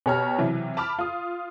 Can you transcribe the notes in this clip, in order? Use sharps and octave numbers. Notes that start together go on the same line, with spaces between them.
B2 G4 C#5 A#5 F6
C3 E3 F#3
A5 B5 D6 F6
F4 D#6